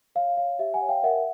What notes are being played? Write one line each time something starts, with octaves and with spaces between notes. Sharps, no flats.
C#5 F5
C#5 F5
G4 E5
F#5 G#5
C#5
F5 G5
A#4 E5 F#5